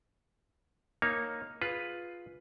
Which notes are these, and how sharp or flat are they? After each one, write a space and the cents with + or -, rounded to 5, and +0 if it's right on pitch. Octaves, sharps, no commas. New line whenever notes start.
A#3 +0 D#4 +0 C#5 +0
F4 +0 G#4 +0 B4 +0